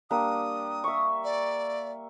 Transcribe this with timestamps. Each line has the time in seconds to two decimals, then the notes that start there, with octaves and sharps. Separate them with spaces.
0.10 G3 A#3 D4 D#6
0.84 E5 C#6
1.24 D5